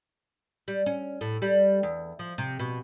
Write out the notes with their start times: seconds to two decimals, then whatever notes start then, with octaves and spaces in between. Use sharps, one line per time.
0.68 G3
0.86 C#4
1.21 A2
1.42 G3
1.83 E2
2.19 F3
2.38 C3
2.59 B2